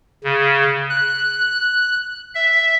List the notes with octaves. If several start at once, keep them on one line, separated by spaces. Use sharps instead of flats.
C#3
F#6
E5